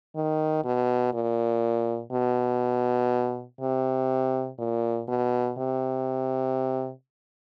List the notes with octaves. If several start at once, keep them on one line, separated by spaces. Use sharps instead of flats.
D#3
B2
A#2
B2
C3
A#2
B2
C3